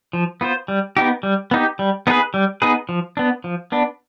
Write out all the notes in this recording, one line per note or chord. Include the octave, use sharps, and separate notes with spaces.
F3
B3 F4 C5
G3
B3 D#4 G4
G3
B3 D#4 G4
G3
B3 D#4 G#4 B4
G3
B3 D#4 G#4 B4
F3
B3 D4
F3
B3 D4